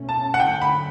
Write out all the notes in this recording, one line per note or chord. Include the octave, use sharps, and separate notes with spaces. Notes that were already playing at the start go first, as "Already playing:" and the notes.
Already playing: B2 A3 C#4
A5
F#5
D3 F#3 A3 C#4 G5
B5